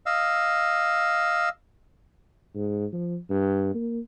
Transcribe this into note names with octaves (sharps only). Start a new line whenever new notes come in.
D#5 F5 E6
G#2
F3
G2
A#3